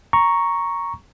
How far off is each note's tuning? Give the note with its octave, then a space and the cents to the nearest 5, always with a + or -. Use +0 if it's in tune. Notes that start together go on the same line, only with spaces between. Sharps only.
A#5 +0 C#6 +0